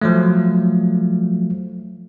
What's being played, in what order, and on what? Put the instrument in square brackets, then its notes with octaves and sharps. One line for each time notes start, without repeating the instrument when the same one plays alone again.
[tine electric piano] F3 F#3 A3